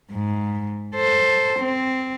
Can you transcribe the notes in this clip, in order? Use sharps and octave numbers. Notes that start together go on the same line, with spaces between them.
G#2
A4 C5
C4